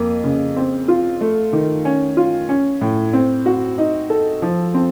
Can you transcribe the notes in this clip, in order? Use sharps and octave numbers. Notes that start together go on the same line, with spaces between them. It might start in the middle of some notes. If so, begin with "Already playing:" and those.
Already playing: F2 A#3
C#3
C4
F4
A3
D#3
C#4
F4
C#4
A2
C4
F#4
D#4
A4
F3
C4